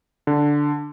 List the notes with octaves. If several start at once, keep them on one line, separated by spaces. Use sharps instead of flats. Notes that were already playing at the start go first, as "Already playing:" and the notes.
D3